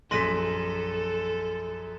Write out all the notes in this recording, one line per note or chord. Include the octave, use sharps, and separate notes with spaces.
A#1 F#2 A4 C6 A#6 B6 D#7